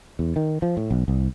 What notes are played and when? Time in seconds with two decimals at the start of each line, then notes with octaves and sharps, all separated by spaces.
0.19 E2
0.36 D#3
0.62 F3
0.77 A2
0.91 B1
1.08 C2